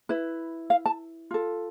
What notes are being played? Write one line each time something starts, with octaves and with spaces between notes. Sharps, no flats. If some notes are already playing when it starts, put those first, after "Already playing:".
E4 B4
F5
A5
F4 A4